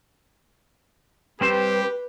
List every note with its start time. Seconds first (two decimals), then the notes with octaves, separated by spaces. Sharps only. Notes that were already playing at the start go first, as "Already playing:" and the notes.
1.41 G3 C4 G4 B4 C5